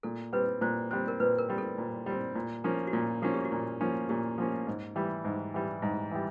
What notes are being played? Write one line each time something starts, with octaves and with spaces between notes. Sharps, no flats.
A#2 A4
G3 C4 B4
A#2 C5
G3 C4 C5
A#4
A#2 B4
A#4
G3 C4
A4
A#2
G3 C4
A#2
F3 A#3 C#4
F#4
A#2 F4
F3 A#3 C#4 F#4
G4
F#4
A#2
F3 A#3 C#4
A#2 G4
F3 A#3 C#4
G#2
E3 G3
G#2
E3 G3
G#2
E3 G3